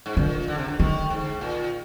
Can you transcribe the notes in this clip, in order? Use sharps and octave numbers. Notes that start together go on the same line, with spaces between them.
G#2
A#2 D3
D3
C3
D3
D3 D#3
G#2
A#2